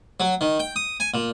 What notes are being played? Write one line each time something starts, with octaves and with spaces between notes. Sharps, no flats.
F#3
D#3
G5
D#6
G#5
A#2